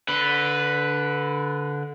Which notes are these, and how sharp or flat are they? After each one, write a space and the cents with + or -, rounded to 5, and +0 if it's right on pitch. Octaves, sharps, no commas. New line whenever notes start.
D3 -15 B4 +0